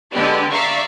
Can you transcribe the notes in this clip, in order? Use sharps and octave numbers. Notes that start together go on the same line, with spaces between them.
D3 G#3 B3 G4 D5
D5 E5 F5 A#5 C#6